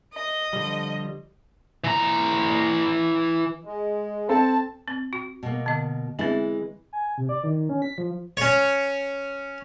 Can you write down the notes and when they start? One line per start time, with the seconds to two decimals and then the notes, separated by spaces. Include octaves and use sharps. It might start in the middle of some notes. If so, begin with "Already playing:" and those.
0.13 D#5
0.53 D3 F3 G3
1.84 E3 A#5
3.65 G#3
4.29 C4 A4 A5
4.88 C4
5.13 F#4
5.43 B2 A#3
5.66 D3 D#5
6.19 E3 G#3 B3 C4 E4
6.93 G#5
7.18 C3
7.29 D5
7.44 D#3
7.69 C#4
7.82 B6
7.98 F3
8.37 C#4 C#5